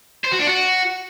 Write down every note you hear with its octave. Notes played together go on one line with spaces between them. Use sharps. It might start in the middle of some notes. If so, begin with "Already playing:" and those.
C5
F#4
D4
F#4